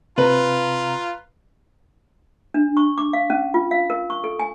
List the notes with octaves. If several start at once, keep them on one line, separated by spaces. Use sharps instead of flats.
C3 F4 B4 A#5
D4
C#6
D6
F5
C#4
F4
F5
A#4
C#6
A4
G#5